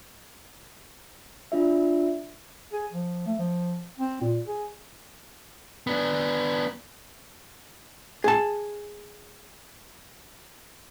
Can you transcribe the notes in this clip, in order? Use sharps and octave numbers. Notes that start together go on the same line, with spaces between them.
D4 F4 E5
G#4
F3
A3
F3
C4
A#2
G#4
B3 D4
G#4 A5